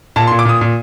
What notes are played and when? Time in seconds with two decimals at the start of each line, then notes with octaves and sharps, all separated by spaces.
0.16 A#2 A5
0.27 C6
0.31 A#2
0.39 D6
0.45 A#2 D#6
0.61 A#2